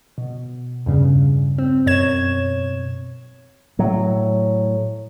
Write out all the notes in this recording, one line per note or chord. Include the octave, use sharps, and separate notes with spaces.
B2
E2 G2 C#3
C4
F#2 B2 C#5 G#6 E7
A2 F#3